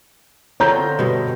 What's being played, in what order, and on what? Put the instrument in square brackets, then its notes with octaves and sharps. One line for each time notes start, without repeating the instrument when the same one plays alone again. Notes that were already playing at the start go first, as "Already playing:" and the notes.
[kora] D3 C4 F4 [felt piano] C#5 A#5 G6
[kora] G2 B2